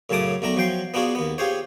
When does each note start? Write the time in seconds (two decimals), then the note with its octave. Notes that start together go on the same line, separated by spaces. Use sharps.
0.10 F#2 A2 C#3 A5 D6 D#6
0.42 B1 A3 D4 A#5
0.56 F3 F#3 G5 C6
0.94 B3 D4 F4 F#4 G#4
1.15 D#2 B3
1.38 F4 G4 G#4 C5 C#5